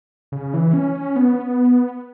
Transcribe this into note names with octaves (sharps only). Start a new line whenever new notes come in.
C#3
E3
C#4
C#4
B3